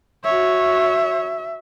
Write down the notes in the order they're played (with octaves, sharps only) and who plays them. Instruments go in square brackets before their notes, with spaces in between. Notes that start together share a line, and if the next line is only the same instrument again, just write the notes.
[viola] F#4 C#5 [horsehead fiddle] E5